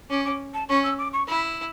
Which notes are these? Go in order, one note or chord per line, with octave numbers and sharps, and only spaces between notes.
C#4 D6
D6
A5
C#4 C#6
E6
D6
C#6
E4 B5